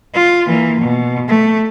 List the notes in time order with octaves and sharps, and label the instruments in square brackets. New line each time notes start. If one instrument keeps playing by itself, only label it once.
[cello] F4
E3 A#3
B2
A3